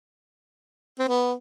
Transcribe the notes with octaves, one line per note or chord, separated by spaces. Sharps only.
C4
B3